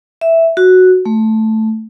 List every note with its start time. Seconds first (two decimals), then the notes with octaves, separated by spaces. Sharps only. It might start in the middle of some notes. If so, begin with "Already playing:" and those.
0.21 E5
0.57 F#4
1.06 A3